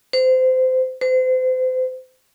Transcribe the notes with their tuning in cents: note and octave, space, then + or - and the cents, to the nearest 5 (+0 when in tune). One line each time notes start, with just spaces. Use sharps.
C5 -25
C5 -35